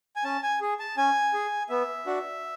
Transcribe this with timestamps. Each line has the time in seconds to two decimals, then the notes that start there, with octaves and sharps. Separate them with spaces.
0.16 G#5
0.24 C#4 A5
0.43 G#5
0.61 G#4
0.79 A5
0.97 C#4 G#5
1.34 G#4
1.69 B3 E5
2.06 D4 F#4